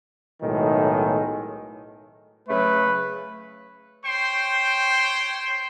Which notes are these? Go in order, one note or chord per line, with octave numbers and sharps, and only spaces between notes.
B1 A2 D#3 G#3
C#3 F#3 A3 B4
C5 C#5 G5 C6